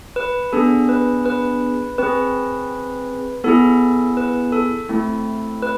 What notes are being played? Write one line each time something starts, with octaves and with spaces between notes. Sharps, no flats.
B4
B3 D4 G#4 A4
B4
B4
C4 G#4 B4
B3 E4 G#4 A4
B4
A4
A3 C4 E4 A4
B4